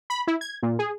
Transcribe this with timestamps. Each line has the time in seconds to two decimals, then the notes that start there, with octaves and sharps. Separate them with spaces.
0.10 B5
0.27 E4
0.41 G#6
0.63 A#2
0.79 G#4